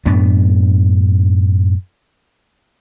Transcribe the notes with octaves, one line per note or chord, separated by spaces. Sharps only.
F#2 A2 B3 D4